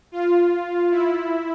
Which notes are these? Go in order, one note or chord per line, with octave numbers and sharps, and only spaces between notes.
F4
E4